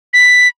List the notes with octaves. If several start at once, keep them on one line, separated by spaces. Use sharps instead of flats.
B6